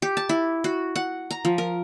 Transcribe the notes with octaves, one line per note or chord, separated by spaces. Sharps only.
G4
A5
E4
F#4
F#5
A#5
F3
A#4